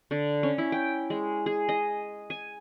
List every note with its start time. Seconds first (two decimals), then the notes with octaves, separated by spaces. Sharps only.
0.11 D3
0.43 C#4
0.58 E4
0.72 G5
1.10 G#3
1.46 G#4
1.69 D#5
2.30 G#5